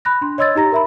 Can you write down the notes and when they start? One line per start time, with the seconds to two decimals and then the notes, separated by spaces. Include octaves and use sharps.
0.05 B5 F#6 A#6
0.21 D4 C6
0.38 C#5 D#5 C6 E6 G#6 A6
0.55 D#4 G4 A#5 A#6
0.72 A#4 E5 B5